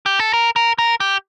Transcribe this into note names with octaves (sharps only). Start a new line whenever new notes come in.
G4
A4
A#4
A#4
A#4
G4